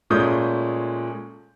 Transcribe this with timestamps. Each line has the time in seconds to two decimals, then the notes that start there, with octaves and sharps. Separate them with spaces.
0.10 A#2 G#3 A3 C#4 D#6 G6